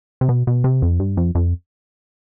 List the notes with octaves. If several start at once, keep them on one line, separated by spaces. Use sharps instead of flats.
C3
B2
B2
C3
F2
G2
F2
F2